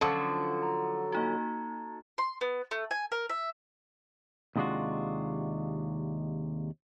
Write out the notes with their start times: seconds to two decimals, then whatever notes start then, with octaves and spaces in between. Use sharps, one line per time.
0.01 D3 F3 F#3 C#4 A4 A5 C#6 D6
0.63 A#5
1.12 A#3 D#4 F#4 A#5 G#6
2.18 C6
2.41 B3
2.71 A3
2.91 G#5
3.12 A#4
3.29 E5
4.56 D#2 C3 G#3 D4 F4 F#4